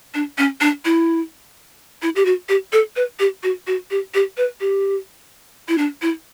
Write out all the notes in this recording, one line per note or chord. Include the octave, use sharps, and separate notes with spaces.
D4
C#4
D4
E4
E4
G4
F#4
G4
A4
B4
G4
F#4
F#4
G4
G4
B4
G4
E4
D4
E4